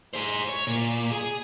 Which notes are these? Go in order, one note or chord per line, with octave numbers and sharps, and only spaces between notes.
G#4 C5
C#5
A#2
G#4